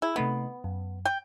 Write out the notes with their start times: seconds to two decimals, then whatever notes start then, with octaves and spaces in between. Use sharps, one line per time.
0.02 E4 G#4
0.16 C3 A3 B3 D#4
0.64 F#2
1.05 G5